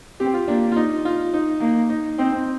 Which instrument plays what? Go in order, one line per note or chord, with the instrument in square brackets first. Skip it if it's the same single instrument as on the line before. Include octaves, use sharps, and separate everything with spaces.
[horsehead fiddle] C4 [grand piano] G4
[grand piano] F4
[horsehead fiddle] A#3 [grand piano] D4
[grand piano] F4
D#4
F4
D#4
[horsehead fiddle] A#3
[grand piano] D#4
[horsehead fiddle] C4 [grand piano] D#4
[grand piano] C4